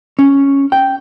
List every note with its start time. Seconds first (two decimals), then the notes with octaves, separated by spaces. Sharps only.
0.19 C#4
0.72 G5